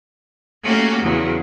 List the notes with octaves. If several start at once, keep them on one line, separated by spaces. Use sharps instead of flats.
A3 A#3 C#4 F#4 G4
E2 C#3 F#3